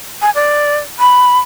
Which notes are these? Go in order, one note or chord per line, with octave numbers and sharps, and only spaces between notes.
G#5
D5
B5